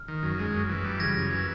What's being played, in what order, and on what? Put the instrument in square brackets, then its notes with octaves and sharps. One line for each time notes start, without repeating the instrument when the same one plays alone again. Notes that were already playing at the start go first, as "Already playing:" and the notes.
Already playing: [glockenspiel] F6
[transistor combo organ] D#3
F#2
G#3
F#2
E3
G3
[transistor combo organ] C#3 [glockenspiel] G#6 A#6
[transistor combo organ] F#2
E3